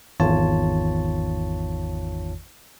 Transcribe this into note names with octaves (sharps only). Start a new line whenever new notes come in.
G#1 E2 D#3 F4 C#5 A5